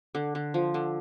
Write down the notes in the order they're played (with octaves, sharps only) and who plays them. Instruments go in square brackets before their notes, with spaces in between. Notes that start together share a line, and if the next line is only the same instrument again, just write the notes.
[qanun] D3
D3
F3
D3